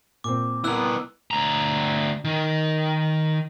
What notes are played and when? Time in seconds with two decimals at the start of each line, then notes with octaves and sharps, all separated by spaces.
0.24 A#2 C4 D6
0.64 B3 E4 A#4 E6 F#6
1.31 D2 A#5
2.25 D#3